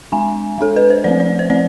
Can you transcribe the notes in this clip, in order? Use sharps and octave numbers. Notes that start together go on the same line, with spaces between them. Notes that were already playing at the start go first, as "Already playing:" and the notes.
G#3 D4 G#5
G#3 D4 A4
B4
C5
F3 A3 C4 D5
D5
C5
F3 A3 C4 D5